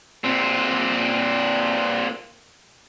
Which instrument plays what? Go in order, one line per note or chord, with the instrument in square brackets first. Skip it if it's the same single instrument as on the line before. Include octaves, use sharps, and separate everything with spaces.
[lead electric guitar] A#2 C4